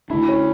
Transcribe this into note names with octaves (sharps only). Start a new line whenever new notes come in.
D3 A3 D4 E4
C#4